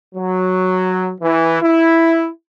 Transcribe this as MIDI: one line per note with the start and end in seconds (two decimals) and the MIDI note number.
0.15 1.12 54
1.21 1.60 52
1.62 2.28 64